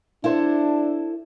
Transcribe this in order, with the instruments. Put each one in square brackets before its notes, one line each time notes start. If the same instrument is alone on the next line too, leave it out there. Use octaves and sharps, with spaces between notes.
[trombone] D4 [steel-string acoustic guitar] E4 A4 C5